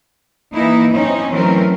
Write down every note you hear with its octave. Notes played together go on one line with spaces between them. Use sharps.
E3 A#3 D#4 E4
C4 C#4 D#4
E3 F#3 A3 C4 C#4 A#4